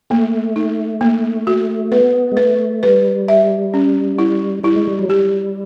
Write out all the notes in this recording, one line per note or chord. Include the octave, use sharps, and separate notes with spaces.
A3 A#3
D#4
A#3
F#4
B3 B4
G#3
A3 B4
G3 B4
E5
C#4
E4
G3 E4
G#3
G3
F#3
G3 G4